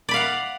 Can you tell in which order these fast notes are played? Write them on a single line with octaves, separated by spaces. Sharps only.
D5 B5 F5 F#5